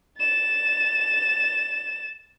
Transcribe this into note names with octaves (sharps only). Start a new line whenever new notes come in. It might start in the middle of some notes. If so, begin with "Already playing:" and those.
A6 E7